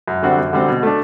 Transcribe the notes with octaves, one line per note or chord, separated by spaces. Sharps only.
F#2
D3 G3 C4 F#4
F#2
D3 G3 C4 F#4
B2
A3 D4